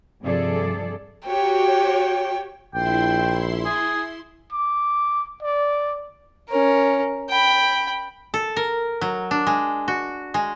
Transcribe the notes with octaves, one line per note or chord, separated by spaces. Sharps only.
G2 C3 F3 G#4 A4 D5
F#4 G4 C#5 G5
A#1 E4 G5 C6
G#4
D6
D5
C#4 A#4
G5 B5
A4
A#4
F#3
D4
G#3
F#4
G#3